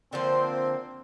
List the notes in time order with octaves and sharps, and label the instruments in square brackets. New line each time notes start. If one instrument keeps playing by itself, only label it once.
[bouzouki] D3 F3 C5 [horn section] A#3 C4